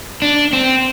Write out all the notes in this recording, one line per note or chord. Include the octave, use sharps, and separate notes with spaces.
D4
C4